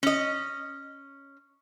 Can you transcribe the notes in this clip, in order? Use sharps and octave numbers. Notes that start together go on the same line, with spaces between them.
C#4 D#5